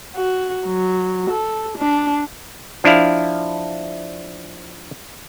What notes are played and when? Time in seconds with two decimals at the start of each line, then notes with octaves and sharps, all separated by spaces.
0.15 F#4
0.65 F#3
1.29 A4
1.77 D4
2.84 F3 D4 E4 F5